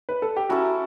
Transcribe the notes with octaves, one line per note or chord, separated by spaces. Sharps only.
B4
A4
G4
F#3 C#4 E4 F#4 A4